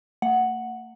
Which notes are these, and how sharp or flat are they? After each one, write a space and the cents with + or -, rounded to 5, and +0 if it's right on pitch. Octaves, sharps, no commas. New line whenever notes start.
A3 +45 F#5 +0